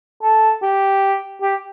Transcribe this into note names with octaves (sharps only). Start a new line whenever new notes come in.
A4
G4
G4